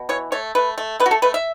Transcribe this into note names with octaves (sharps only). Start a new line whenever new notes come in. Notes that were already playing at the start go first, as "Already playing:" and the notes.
Already playing: B2
E3 C#5
A3 C#5
A3 B4
A3
A3 B4
F#4
A4
A3 B4
E5